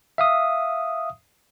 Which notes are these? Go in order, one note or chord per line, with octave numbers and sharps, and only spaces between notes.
E5 F5 D#6